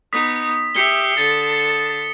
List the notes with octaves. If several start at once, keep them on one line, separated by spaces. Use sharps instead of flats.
B3 D#4 D#6 B6
G4 E5 C7 C#7 G7
D3 A5 A6 C#7